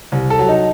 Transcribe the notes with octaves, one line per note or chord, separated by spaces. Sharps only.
C2
A4
F#3
D#4